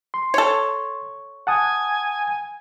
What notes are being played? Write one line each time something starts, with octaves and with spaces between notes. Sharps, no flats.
C6
A4 C#5
F#5 G#5 A5 D#6